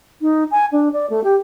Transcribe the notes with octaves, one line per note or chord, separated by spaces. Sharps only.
D#4
G#5
D4
D5
A3
G4